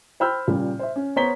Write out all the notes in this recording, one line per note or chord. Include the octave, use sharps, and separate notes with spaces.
C5 G5 B5 E6 F6 G6
A#2 C#3 G3
C5 E5
C#4
B3 C5 C#5 A#5 B6 G7